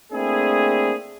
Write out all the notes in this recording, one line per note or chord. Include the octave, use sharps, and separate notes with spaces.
A3 A#3 C4 D4 E4 G#4